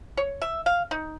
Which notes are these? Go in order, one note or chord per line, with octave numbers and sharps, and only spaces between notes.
C#5
E5
F5
D#4